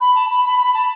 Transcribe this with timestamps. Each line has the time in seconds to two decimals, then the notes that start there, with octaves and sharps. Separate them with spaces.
0.01 B5
0.15 A5
0.31 B5
0.45 B5
0.60 B5
0.74 A5